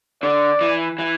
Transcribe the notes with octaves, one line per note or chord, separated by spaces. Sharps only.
D3 D5
E3
E3